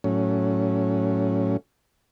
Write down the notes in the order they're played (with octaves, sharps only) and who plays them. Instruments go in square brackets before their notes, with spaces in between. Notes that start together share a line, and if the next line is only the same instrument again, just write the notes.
[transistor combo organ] A2 F#3 C#4